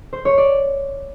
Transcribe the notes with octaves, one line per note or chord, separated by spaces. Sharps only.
C5
C#5
D5